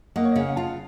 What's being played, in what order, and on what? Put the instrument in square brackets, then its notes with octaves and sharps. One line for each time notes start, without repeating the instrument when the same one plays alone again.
[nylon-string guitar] A#3 [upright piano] D#5 F#5
[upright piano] C#5
D#5
[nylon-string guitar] C#3
[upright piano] F5
F#5
[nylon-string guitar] F4 [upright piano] F5 A5